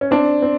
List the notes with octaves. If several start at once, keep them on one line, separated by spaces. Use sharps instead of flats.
C#4
C4 D4
C4